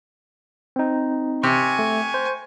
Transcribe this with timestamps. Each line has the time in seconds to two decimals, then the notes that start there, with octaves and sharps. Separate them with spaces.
0.76 C4 D#4
1.43 C3 G#5 C#6
1.79 A3
2.14 C5